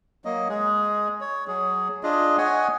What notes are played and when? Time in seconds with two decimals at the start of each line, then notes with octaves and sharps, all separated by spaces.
0.25 F#3 A#3 D#5
0.49 G#3 G#4
1.21 C#5
1.47 F#3 G#4
2.03 D4 F4 G#4 D#5
2.38 C#5 D#5 F#5 G#5